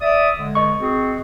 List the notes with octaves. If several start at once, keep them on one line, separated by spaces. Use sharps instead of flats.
D5 E5 D#6
D3 G#3
D#5 C#6
C4 F#4 G#4